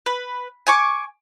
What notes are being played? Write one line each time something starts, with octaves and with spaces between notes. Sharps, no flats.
B4
G#5 C#6 D6